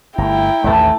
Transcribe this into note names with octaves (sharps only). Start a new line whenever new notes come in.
G1 A3 E4 G5 A#5
A1 D#2 A2 E3 A3 A5